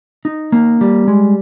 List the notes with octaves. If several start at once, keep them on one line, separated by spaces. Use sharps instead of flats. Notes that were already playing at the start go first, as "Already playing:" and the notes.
D#4
A#3
G3
G#3